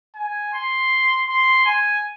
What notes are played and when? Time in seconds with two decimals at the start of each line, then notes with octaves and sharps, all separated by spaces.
0.15 G#5
0.53 C6
1.28 C6
1.65 G#5